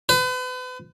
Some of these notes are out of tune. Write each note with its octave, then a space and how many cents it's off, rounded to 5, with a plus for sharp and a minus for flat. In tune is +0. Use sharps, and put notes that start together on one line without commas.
B4 +40